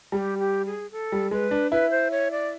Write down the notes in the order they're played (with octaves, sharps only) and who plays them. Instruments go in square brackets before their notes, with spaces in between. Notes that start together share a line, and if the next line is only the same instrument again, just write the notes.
[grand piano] G3 [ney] G#4
[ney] G4
G4
G#4
A4
[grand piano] G3
[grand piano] G#3 [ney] B4
[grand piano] D4
[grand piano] E4 [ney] B4
[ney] C5
C#5
D5